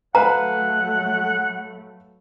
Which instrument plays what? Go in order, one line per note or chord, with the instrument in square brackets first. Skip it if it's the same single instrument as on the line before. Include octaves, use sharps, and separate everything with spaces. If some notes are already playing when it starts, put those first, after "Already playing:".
[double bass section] F#3 A3 [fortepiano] B4 F5 [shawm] F#5 [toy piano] A#5